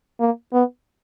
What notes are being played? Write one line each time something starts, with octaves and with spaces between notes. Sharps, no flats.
A#3
B3